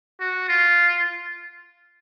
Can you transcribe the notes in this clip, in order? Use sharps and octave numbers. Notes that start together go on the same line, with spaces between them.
F#4
F4